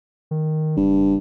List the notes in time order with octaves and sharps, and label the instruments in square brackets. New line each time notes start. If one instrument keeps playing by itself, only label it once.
[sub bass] D#3
[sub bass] F#1 [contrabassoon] G2